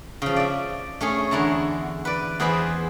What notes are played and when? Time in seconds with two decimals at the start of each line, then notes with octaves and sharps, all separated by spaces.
0.22 C#3 F3
0.36 D5 E5
1.01 A3 C#4 G#4
1.31 E2 D3 E4 A5 A#5
2.05 B4 D5
2.40 E2 G#4 B4 C5 E5 B5